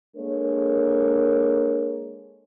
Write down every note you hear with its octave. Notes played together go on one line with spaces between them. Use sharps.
G#3 A#3 D4 A4 A#4 C#5